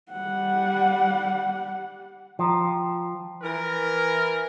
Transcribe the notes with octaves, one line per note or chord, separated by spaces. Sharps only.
G3 F#5
F3 G5 A#5
E3 A#4